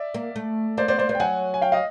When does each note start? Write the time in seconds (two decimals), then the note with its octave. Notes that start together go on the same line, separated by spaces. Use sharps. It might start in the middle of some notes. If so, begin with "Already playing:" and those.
Already playing: D5 E5
0.14 A#3
0.36 A3
0.78 A#3 C5 D5
0.88 B3 C5 D5
0.98 A#3 C5 D5
1.09 B3 C5 D5
1.15 G5
1.20 F#3 F#5 G#5
1.54 G#5
1.61 F5 G5
1.72 D#5 F5